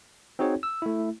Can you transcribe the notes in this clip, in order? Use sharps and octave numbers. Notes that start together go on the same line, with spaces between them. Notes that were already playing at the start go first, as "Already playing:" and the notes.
C4 D#4 F#4 G#4 C#5
E6
A3 E4